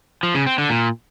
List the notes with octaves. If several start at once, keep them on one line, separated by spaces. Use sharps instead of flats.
F3
C#3
C4
D3
A#2